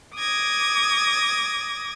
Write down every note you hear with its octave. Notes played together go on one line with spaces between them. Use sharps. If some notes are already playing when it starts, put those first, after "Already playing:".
D6 D#6 G#6 A#6